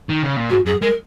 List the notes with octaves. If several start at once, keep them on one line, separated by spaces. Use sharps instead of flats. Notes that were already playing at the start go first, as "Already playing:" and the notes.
D#3
C#3
A#2
G#2 F#4
F#2 G#4
G#3 A#4